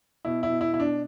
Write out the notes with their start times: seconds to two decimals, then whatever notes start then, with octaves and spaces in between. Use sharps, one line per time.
0.25 B2 E4
0.43 E4
0.49 B2
0.61 E4
0.73 B2 E4
0.80 D4